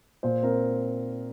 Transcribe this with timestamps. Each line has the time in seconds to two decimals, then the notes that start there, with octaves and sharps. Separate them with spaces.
0.23 A#2 C5
0.43 C4 A#4